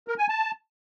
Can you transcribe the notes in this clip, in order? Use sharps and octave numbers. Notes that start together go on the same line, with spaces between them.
A#4
G#5
A5